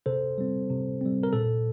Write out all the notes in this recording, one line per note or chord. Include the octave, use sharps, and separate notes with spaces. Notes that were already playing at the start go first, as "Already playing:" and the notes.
C3 A4 C5
G3 C4
C3
G3 C4
A#4
A#2 A4